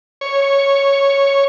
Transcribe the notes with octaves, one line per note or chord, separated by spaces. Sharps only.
C#5